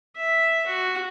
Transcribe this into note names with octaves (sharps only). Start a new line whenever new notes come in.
E5
F#4